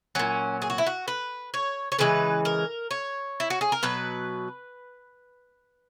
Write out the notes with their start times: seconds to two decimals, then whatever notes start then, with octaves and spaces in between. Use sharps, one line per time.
0.15 A#2 F#3 C#4
0.62 G#4
0.70 F#4
0.78 E4
0.87 F#4
1.08 B4
1.54 C#5
1.92 C#5
1.99 C#3 E3 G#3 B4
2.45 A#4
2.91 C#5
3.40 E4
3.50 F#4
3.61 G#4
3.72 A#4
3.83 B2 F#3 B4